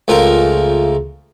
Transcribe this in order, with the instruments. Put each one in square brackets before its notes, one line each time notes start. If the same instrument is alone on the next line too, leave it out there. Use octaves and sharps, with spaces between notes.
[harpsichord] C#2 F3 A3 A#4